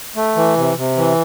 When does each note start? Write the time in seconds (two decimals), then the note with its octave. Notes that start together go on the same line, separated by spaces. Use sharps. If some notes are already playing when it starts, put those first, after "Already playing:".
0.16 A3
0.36 E3
0.57 C3
0.77 C3
0.97 E3